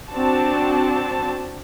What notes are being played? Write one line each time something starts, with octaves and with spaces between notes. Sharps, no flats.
C4 D4 F#4 A5